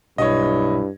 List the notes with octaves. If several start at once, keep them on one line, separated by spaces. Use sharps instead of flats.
B1 G2 E4 C#5 D#5